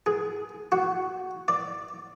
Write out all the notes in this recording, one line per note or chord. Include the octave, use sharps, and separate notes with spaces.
G#4
F#4
D5